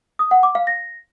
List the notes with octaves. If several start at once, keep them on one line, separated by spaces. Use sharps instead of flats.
D#6
F#5
D6
F5
A#6